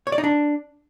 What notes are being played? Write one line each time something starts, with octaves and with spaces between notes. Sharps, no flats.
C#5
D5
D#4
D4